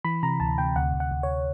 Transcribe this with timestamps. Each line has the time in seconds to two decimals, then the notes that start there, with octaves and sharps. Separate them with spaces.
0.05 E3 B5
0.23 C3 A#5
0.40 D2 A5
0.58 C3 G5
0.76 D2 F#5
0.94 D2
1.00 F#5
1.11 D2
1.23 C#5